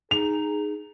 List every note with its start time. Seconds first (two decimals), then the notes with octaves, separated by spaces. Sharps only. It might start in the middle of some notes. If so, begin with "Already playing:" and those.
0.11 D#4 G#4 F7